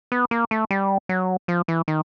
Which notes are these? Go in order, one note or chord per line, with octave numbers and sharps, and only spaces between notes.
B3
A#3
A3
G3
F#3
F3
E3
D#3